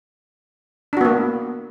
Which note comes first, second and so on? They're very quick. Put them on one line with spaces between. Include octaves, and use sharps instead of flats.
D4 F#4 B3 A#3